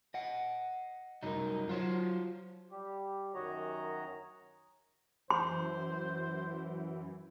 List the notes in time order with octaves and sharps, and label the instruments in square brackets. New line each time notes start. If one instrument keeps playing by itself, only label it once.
[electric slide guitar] D#5 F#5
[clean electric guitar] C2 A#4 [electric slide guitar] F#2 F#3 D#4
[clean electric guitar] F#3 [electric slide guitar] F4 C5 C#5
[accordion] G3 G4
F#2 D#3 F#4 C#5 D#5 A#5
[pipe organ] F#2 E3 [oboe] C5 [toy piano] C6